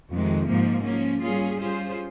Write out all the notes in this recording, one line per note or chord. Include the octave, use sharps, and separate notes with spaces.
F2 C3 D#3 G#3
G#2 F3 A#3
F3 A#3 C#4
G3 A#3 C#4 F4 G#4
G3 C#4 F4 G#4 C5